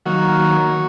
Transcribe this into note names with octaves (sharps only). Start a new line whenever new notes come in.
D#3 F#3 A#3 F#4